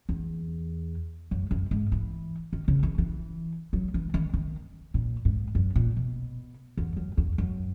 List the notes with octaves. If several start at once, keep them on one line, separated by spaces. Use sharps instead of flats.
E2
F#2
F#2
G#2
E3
D#3
C#3
E3
E3
F#3
E3
D#3
D#3
A#2
G#2
F#2
A#2
B2
E2
F#2
E2
F#2